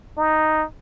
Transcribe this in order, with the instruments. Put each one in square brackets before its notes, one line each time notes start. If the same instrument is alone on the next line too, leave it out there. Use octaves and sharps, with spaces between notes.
[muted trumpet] D#4